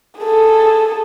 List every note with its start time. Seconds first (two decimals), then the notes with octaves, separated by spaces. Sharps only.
0.20 G#4 A4